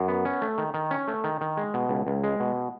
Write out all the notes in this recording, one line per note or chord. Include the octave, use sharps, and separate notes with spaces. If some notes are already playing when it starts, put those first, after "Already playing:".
Already playing: F#2
B3
C#4
A3
D#3
D#3
C#4
A3
D#3
D#3
G#3
B2
C#2
C#2
G#3
B2